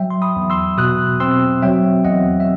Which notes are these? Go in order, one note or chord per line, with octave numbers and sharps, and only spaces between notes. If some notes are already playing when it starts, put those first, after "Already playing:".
Already playing: F#3 E5 G5
C6
B5 D#6
E2
C6 E6
B2 D#6 F#6
C4 C6 E6
F#3 E5 G5
E2 D#5 F#5
E5